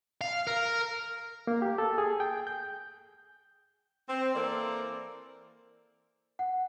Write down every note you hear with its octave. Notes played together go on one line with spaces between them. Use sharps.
F5
A#4
A#3
G4
A4
G#4
G5
G6
C4
E3 A#3 A4 A#4 C5 D5
F#5